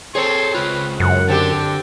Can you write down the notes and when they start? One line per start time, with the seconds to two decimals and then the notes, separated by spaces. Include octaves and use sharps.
0.15 C4 G#4 A4 C#5 C6
0.55 C#2 F4 B4
1.00 F#2 F#5
1.29 D3 C4 G4 A5